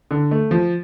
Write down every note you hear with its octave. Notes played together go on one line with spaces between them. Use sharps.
D3
A3
F3